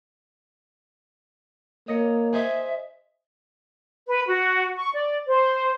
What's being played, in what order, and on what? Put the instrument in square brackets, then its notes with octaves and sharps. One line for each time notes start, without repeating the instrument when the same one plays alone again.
[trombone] A#3 [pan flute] C#5 [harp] D#5 A#6 C#7
[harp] G#4 C5 D#5 [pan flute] E5
[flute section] B4
F#4
C#6
D5
C5